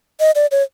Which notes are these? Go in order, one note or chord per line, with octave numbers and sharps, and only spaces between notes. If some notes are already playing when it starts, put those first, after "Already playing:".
D#5
D5
C#5